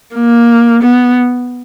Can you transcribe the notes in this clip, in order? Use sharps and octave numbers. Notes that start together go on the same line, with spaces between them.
A#3
B3